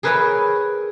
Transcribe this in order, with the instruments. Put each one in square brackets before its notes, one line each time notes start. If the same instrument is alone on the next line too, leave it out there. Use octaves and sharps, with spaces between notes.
[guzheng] G#4 A#4 B4 C#5 E5 G5